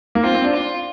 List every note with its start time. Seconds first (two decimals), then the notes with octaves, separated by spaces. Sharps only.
0.15 A#3
0.23 C4 F4
0.34 C4
0.44 D4
0.54 F4